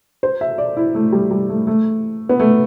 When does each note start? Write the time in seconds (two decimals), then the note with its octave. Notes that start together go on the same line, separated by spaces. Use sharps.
0.23 C5
0.41 E5
0.58 D5
0.77 E4
0.95 A3
1.13 G3
1.31 G3
1.49 A3
1.67 A3
2.29 B3
2.40 A3